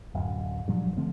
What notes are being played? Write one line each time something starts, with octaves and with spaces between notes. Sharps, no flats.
D1 F#2
G2 A#2 F3 F#3
D3 F3 A3 C4